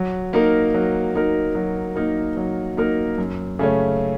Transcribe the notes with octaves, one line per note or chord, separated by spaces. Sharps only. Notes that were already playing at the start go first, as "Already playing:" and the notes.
Already playing: F#3
A#3 D#4 A#4
F#3
A#3 D#4 A#4
F#3
A#3 D#4 A#4
F#3
A#3 D#4 A#4
F#2
C#3 A3 C#4